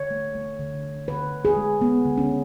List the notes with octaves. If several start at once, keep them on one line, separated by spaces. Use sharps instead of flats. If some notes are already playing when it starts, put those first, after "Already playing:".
Already playing: D3 C#5
A3
A3
D3
D3
D3 B4
D3
G#4
G#3
G#3 B3
D3
C#4